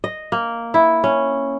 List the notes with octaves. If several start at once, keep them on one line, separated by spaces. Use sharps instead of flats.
D#5
A#3
E4
C#4